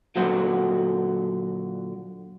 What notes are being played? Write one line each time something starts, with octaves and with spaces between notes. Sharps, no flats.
A#2 D3 F#3 F#4 C5 F#5